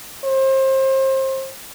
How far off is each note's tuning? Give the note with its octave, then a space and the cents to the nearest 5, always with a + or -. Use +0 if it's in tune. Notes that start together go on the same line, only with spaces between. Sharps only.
C5 +30